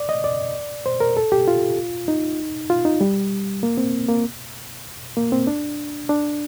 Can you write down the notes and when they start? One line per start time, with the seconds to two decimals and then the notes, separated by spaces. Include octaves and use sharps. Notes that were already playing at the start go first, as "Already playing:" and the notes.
Already playing: D5
0.09 D#5
0.24 D5
0.86 C5
1.00 A#4
1.17 A4
1.32 G4
1.48 F4
2.08 D#4
2.70 F4
2.85 D#4
3.01 G3
3.63 A#3
3.77 C4
4.09 A#3
5.17 A#3
5.32 C4
5.47 D4
6.09 D4